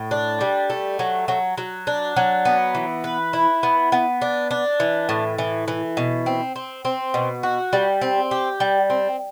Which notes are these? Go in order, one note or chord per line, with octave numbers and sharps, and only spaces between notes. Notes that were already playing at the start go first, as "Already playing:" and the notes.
Already playing: A2
D4
G3
A3
F#3
F#3
F#3
D4
F#3
B3
E3
B4
E4
B3
B3
D4
D4
E3
A2
E3
E3
B2
C4
C4
C4
B2
F#4
G3
C4
G4
G3
C4